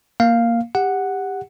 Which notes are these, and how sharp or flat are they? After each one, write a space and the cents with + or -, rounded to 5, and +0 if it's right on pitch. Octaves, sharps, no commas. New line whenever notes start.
A#3 +0 F5 +0
G4 +20 F#5 +0